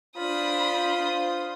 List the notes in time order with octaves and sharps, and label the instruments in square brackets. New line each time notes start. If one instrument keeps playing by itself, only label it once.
[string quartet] D4 B5 [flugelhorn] F4 [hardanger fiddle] C5 D#6